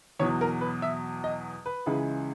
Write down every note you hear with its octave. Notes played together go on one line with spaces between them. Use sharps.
E2 B2 F#3 C#5
A#4
B4
E5
D#5
B4
C#2 C#3 E3 G#3